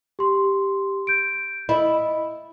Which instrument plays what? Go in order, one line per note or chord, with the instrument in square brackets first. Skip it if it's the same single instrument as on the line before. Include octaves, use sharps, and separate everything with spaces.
[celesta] G4 C6
G6 D7
[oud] E4 [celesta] D#5